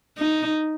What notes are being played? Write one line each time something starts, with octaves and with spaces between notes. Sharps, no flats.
D#4